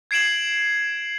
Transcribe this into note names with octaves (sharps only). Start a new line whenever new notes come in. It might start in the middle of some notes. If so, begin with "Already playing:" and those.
G#6 C7 D7 E7 F#7